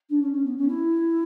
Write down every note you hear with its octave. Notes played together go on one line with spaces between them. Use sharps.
D4
C#4
C#4
B3
C#4
E4